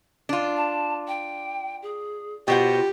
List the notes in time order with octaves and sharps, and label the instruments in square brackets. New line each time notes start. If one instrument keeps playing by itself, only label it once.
[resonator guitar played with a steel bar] D4 F4
[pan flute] A5
G5
G#4
[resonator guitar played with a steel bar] B2 C5 F#5 [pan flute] F4 [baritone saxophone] G4